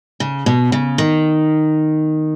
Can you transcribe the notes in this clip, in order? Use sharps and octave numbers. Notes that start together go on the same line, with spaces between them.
C#3
B2
C#3
D#3